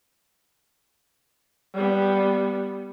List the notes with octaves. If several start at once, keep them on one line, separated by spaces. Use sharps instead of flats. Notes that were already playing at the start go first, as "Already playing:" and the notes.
G3 B3